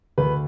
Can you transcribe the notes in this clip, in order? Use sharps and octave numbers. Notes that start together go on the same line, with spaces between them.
D2 B4